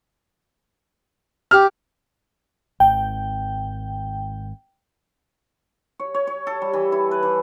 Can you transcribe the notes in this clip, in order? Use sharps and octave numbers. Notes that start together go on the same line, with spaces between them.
G4 F6
G#1 G5
C#5
C#5
C#5
A4
G3
E3
E4
B4
E3